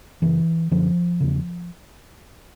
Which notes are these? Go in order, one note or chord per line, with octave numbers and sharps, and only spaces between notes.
F#2 C#3 E3
F#2 D3 F3
E2 C#3